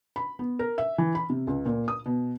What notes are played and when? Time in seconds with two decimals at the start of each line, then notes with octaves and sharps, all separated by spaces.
0.16 B5
0.39 B3
0.59 A#4
0.78 E5
0.98 E3
1.15 B5
1.30 C3
1.47 C#2
1.66 A#2
1.88 D#6
2.06 B2